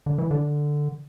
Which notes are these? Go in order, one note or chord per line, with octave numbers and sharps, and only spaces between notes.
D3
E3
D3